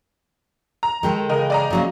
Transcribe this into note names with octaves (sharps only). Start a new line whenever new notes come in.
A#5
D#3 G#3 G4 A4
C#3 E3 A#4 D#5 G5
D5 D#5 A#5
C#3 F#3 A#3